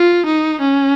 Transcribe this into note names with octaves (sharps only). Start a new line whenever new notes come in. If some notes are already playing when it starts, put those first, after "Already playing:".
Already playing: F4
D#4
C#4